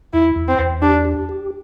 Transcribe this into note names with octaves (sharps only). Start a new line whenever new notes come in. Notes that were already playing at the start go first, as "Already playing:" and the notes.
E2 E4
E2
C4
E2
D4 G4
G4
G4